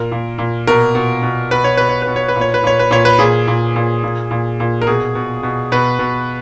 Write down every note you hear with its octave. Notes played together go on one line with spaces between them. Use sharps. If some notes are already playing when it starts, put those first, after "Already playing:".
Already playing: A#2 A#4
A#2
A#2
B2 A#4
B2
B2
B2 B4
C#5
B2 B4
C#5
B4
B2
C#5
B4
A#2
C#5
B4
A#2 C#5
B4
A#2 C#5
B4
A#2 G#4
A#2
A#2
A#2
A#2
A#2
A#4
B2 G#4
B2
B2
B2 B4
B2